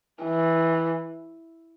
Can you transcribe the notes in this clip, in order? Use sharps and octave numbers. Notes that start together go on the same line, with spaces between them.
E3